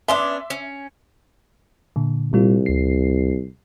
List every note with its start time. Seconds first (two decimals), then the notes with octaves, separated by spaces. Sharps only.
0.08 B3 C#4 D4 E5 C6 D6
0.50 C#4
1.96 A#2 D3
2.33 C2 A#2 G3 F4
2.66 D2 C7